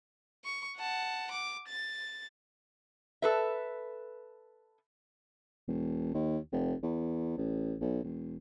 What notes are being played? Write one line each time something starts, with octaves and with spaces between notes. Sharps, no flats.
C#6
F#5 A5
D6
A6
A4 B4 E5
E1
D#2
F1
E2
A1
B1
E1